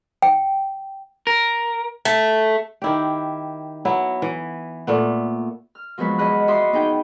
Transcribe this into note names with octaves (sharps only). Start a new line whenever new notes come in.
G5
A#4
A3
D#3 E4 G4
F#3 B3 E4
E3
A#2 A3 B3
F6
F3 F#3 G#3 B3 B4
E2 G#4 D#5 F#5 B5 F#6
F#4 D5 E5 B5 C6 D#6
B3 D#4 G#4 G5